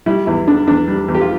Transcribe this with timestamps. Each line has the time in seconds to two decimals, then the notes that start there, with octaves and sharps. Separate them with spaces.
0.06 G3 E4
0.26 E2 E4
0.47 D3 D4
0.67 E2 D4
0.88 G3
1.08 E2
1.15 G4
1.21 F4